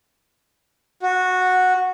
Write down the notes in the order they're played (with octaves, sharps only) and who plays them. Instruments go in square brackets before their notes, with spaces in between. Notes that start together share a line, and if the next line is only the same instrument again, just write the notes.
[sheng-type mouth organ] F#4